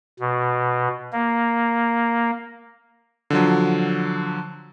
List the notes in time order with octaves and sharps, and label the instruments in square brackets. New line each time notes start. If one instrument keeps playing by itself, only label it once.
[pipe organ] B2
A#3
[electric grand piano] D3 F3 F#3